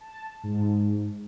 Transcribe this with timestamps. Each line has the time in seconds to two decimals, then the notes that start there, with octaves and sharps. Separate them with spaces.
0.01 A5
0.43 G#2